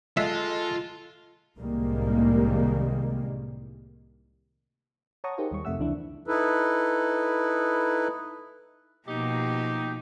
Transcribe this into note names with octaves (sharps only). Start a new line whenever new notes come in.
G#3 F4 A4 E5
C2 A2 D#3 G3 G#3 A#3
C#5 F#5 A5 A#5 C#6 D#6
D#4 G4 G#4 A#4 C5 F5
D#2 G3 C#6
F2 C3 A3 E5 F#5 E6
C#2 E3 D4 E4
D#4 E4 A4 B4
B2 F3 A#3 D#4 G4